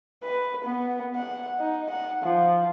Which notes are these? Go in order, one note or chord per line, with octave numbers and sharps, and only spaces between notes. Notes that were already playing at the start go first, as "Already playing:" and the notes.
B4
B3
F#5
D#4
F#5
F3